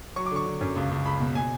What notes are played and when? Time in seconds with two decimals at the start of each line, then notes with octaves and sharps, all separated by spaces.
0.16 F#3 C#6
0.26 D6
0.31 D3
0.36 C#6
0.46 D3
0.61 F#2
0.76 C#2
0.91 C#2
1.06 C#2 B5
1.20 B2
1.35 B2 G#5